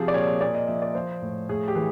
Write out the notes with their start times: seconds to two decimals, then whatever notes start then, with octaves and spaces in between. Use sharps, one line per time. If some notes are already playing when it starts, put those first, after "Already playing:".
Already playing: C3 F3 G#4
0.08 D5
0.14 A#2 C#5
0.41 A#2 D5
0.55 D#5
0.67 F3 E5
0.82 D5
0.95 F3 C5
1.22 A2
1.49 A2 G#4
1.68 G4
1.75 E3 G#4